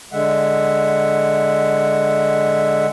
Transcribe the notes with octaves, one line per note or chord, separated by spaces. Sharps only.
D3 G#3 E5 F#5